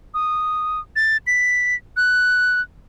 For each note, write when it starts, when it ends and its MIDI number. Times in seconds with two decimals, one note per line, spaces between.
0.14 0.80 87
0.96 1.17 93
1.27 1.75 95
1.97 2.61 90